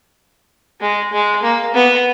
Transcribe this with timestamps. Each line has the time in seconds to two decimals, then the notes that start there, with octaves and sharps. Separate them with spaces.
0.81 G#3
1.13 G#3
1.43 A#3
1.74 B3